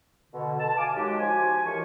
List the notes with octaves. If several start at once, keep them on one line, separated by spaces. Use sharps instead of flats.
B2 D3
A5
F5 G#5 D6
D#3 F#3 G#3 F#4 G4
F3 F#4 G#5
A2 D#3 E3 G4 A#4 C#6